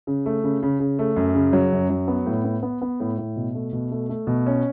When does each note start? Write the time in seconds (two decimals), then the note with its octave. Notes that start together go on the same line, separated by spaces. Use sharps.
0.07 C#3
0.26 A3
0.44 C#3
0.63 C#3
0.80 C#3
0.99 A3
1.16 F#2
1.35 C#3
1.53 F#3
1.72 F#2
1.90 F#3
2.08 B3
2.26 A2
2.44 B3
2.63 B3
2.82 B3
3.00 A2
3.18 A2
3.36 B2
3.55 A3
3.73 B2
3.91 A3
4.09 A3
4.27 B2
4.46 C#4